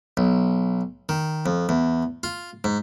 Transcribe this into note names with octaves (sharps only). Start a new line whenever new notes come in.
B1
D#3
F2
E2
F4
G#2